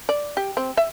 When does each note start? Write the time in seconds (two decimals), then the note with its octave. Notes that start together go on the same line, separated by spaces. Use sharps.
0.09 D5
0.37 G4
0.57 C4
0.77 E5